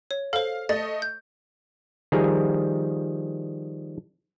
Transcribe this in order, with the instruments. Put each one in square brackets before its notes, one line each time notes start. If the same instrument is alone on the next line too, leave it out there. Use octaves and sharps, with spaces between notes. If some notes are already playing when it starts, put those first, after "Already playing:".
[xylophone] C#5
[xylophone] A4 C5 [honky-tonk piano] F5
[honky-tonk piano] A3 D#5 [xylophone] A6
[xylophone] G6
[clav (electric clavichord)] D#3 F3 G3 G#4 A#5